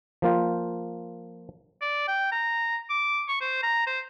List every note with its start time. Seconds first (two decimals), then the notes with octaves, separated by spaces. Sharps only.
0.22 F3 A#3 F4 G5
1.81 D5
2.08 G5
2.32 A#5
2.90 D6
3.28 C#6
3.41 C5
3.63 A#5
3.87 C5